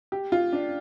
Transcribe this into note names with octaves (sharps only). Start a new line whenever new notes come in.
G4
F4
D4